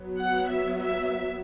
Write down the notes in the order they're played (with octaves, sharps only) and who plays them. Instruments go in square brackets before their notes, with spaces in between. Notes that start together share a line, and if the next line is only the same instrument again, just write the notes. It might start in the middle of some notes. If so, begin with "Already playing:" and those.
Already playing: [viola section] F#3 B3
F#5
E5
E5